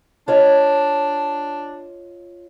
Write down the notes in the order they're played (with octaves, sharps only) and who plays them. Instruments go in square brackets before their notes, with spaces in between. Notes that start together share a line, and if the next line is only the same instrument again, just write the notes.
[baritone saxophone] D4 [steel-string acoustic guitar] F4 C#5 D#5